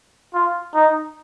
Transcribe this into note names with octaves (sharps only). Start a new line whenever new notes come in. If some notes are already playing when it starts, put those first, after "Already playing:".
F4
D#4